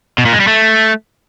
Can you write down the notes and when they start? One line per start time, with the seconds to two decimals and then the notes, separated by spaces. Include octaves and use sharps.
0.18 B2
0.25 A#2
0.33 G#3
0.40 G3
0.47 A3